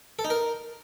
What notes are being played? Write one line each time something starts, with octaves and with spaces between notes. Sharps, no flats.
A4
D#4
A#4